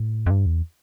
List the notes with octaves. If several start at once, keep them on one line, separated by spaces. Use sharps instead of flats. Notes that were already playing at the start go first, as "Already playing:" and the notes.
Already playing: A2
F2
G2
E2